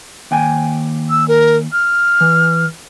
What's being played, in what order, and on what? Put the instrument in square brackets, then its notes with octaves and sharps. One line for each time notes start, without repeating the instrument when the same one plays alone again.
[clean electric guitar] D#2 G5 G#5
[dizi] E6
A#4
F6
[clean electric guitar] E3